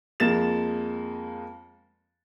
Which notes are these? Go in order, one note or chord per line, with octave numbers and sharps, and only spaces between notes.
F2 G#3 A#3 A6 E7